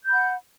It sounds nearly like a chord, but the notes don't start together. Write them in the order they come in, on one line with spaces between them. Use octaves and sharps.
G6 B5 F#5